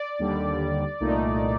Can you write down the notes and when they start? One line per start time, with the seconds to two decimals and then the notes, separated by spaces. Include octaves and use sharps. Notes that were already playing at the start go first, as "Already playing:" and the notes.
Already playing: D5
0.19 D#2 D3 G3
1.00 C2 A#2 A3 D#4